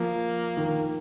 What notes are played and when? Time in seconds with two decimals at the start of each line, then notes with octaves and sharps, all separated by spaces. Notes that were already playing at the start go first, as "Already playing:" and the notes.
Already playing: F3 A#3
0.57 D#3